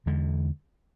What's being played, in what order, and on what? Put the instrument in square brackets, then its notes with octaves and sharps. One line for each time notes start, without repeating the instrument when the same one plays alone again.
[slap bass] E2 D3 G#3